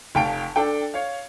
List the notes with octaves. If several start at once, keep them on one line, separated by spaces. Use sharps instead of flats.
F1 F5 G5 A5 D7
D4 A4 G5
C#5 F5